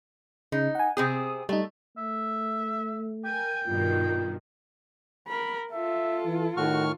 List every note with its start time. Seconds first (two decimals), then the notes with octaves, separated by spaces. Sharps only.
0.52 C#3 D#4
0.75 F#5 G#5
0.97 C3 C4 G#4 D#6
1.49 G3 A3 D#4
1.98 A3 E5
3.25 A#4 G5 G#5
3.68 G2 B2 D#3 F4
5.28 A#4 B5
5.73 F4 A4 E5
6.26 E3
6.57 A2 D#3 F#4 C#6 F6